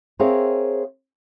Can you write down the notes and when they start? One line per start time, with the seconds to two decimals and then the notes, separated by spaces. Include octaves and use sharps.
0.19 C4 G#4 A#4 C#5 E5 F5